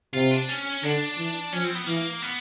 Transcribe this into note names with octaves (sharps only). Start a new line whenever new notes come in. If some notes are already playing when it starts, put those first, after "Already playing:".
C3 F4
D4
C#4
D3 D4
E3
F3 C#4
C4
B3
E3 A#3
B3